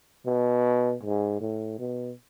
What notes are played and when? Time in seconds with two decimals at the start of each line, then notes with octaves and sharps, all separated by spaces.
0.26 B2
1.03 G#2
1.41 A2
1.79 B2